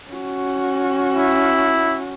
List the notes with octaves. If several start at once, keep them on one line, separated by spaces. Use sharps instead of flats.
C#4 F#4
E4